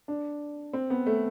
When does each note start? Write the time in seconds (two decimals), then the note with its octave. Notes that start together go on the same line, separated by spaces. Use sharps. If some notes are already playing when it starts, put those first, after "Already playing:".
0.08 D4
0.73 C4
0.90 B3
1.06 A3